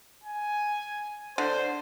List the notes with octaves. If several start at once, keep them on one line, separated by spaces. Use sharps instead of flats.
G#5
D3 C5